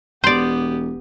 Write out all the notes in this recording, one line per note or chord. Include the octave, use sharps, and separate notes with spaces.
E1 B3 G4 C5 D5